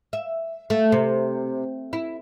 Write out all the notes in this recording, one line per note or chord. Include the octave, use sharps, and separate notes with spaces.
E5
A3
C3
E4